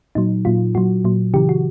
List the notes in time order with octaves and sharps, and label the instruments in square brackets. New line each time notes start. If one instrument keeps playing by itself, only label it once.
[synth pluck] A#2 F#3 D#4
A#2 F#3 F4
A#2 F#3 F#4
A#2 F#3
C#3 E3 G4
F#4